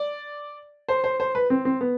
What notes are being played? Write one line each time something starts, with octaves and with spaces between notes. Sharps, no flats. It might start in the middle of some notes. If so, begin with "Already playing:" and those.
Already playing: D5
C5
C5
C5
B4
C4
C4
B3